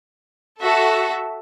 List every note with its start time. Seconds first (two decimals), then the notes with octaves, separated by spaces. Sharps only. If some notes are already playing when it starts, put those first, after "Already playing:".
0.59 F#4 A4 E5